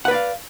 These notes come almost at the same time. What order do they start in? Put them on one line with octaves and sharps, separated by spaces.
F#5 B4 D5 F5